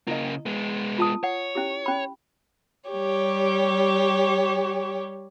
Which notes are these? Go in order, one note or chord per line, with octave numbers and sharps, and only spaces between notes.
C#3 A#3 E4 D#5
G#3 B3
F4 A5 D#6
C#5 F#5
C#4 E4 G4
C#4 B5
G3 G4 C#5